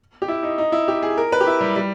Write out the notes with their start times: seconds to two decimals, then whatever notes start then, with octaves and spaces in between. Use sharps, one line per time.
0.22 G4
0.28 E4
0.43 D#4
0.58 D#4
0.72 E4
0.88 G4
1.03 G#4
1.17 A#4
1.32 B4
1.41 G4
1.47 E4
1.61 G3
1.76 G3